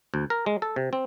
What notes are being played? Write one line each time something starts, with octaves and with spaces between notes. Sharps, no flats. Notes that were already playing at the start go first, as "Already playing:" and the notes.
D2
A#4
G#3
A4
C3
C4